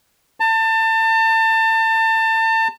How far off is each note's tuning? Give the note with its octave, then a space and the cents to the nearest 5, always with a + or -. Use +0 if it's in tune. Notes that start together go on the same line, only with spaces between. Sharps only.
A5 +30